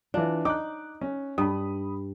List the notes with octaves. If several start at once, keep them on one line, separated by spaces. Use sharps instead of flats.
E3 D4 F4
D#4 D6 F#6
C#4
G2 B5 D#6